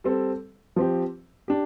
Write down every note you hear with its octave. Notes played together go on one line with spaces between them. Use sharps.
G3 C4 A4
F3 C4 G4
D4 G4